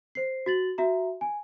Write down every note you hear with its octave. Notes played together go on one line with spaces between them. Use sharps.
C5 C7
F#4 A6 F#7
F#4 E5 A#5
G#5